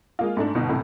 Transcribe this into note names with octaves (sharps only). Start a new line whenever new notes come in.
G#3 A#3 F4
G#2 A3 D4
G1 B2 D#4
F#2 A2 C3